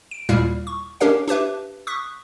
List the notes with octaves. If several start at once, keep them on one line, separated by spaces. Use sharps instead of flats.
D7
D#2 A#2 G3 E4 F5 F6
C#6
C#4 D4 G4 A#4 C#5 F5
D4 G4 B4 E5
C#6 D#6 F#6 B6